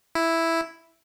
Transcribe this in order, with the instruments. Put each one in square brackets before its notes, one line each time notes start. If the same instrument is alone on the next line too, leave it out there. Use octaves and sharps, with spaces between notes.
[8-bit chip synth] E4